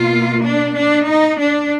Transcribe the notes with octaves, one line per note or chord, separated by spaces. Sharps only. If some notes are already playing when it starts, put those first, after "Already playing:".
Already playing: B2 A#3 F4
D4
D4
D#4
D4